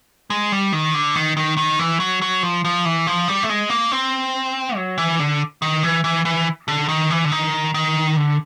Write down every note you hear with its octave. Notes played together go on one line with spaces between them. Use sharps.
G#3
G3
D#3
D3
D#3
D#3
D#3
E3
F#3
F#3
F3
F3
E3
F3
G3
A3
G#3
A#3
C4
F#3
E3
D3
D#3
E3
E3
E3
D3
D#3
E3
D3
D#3
D#3
D3